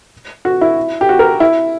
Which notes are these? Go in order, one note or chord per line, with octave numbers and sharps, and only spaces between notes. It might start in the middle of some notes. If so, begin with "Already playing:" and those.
F#4
E4
G4
F#4
A#4
E4